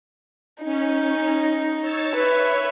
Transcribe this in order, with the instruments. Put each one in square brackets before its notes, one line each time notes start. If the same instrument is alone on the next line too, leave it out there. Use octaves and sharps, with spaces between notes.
[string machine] C#4 [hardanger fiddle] D#4
[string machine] C#5 E6 A6
[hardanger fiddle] B4 [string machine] C#5 E5